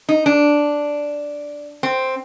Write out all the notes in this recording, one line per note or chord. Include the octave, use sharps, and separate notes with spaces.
D#4
D4
C4